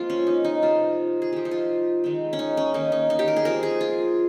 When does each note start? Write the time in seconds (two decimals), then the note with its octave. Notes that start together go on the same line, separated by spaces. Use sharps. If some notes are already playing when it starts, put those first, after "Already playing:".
Already playing: F3 G#3 A#3 C4 F4
0.10 C#4
0.27 D#4
0.44 D#4
0.62 C3 F3 C4 F4
1.22 G#4
1.33 F3 C4 G4
1.45 D#4
1.51 F4
2.04 D#3 G#3 C4
2.33 C#4
2.39 D#4
2.57 C#4
2.74 D#3 A#3 D#4
2.92 D#4
3.10 D#4
3.19 G4
3.28 A#4
3.36 G#4
3.45 F3 C4 A#4
3.63 G#4
3.81 F4